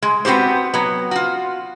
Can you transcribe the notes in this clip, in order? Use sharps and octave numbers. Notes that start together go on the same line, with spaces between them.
G#3
B3 C4 F#4 G4 C5
F#3 B3
F4 F#4